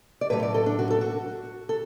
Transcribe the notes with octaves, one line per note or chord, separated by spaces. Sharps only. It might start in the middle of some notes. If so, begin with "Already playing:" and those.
D5
A2 F#3 A3 B4
D5
A4
D4
F#4
A4
F#4
A4